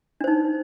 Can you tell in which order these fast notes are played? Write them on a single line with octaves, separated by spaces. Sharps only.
D4 C5 D#4